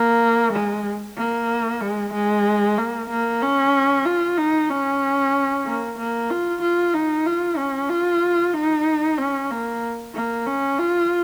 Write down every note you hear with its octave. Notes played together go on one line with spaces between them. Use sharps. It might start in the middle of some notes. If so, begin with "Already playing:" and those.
Already playing: A#3
G#3
A#3
G#3
G#3
A#3
A#3
C#4
F4
D#4
C#4
A#3
A#3
F4
F4
D#4
F4
C#4
F4
D#4
C#4
A#3
A#3
C#4
F4